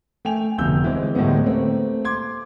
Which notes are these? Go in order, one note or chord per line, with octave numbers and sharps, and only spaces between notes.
A3 G5 G#5 F7
F1 D2 B2 E6 G6
E3 G#3 C4
D2 A2 G3 G#3 B3
A3 A#3 C4
C6 D6 G#6